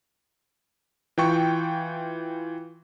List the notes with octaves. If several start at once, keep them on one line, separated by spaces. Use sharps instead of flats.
E3 F4 G5 C#6